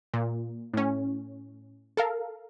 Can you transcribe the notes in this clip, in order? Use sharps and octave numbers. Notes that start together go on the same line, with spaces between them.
A#2
A2 C#4
A4 A#4 F5